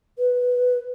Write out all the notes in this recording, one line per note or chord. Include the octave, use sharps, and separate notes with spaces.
B4